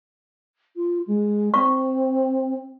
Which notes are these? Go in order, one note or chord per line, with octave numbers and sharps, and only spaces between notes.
F4
G#3
C4 C#6